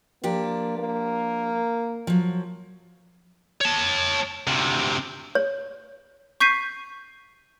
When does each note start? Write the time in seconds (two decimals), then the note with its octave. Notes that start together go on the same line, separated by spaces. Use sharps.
0.24 F3 A#3 D4 G4
0.79 A#3
2.07 F3 F#3
3.61 C#5 A5
4.47 D2 C3
5.35 C#5
6.40 C#6 G6 B6 C7 D#7